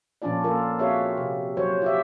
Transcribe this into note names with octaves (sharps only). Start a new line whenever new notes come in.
A#2 F3 C#4 D4 F4 D5
A#3 F4 A4 A#4
C4 F#4 G#4 C#5 E5 F5
C3
F#3 F#4 C5 C#5
F4 G4 E5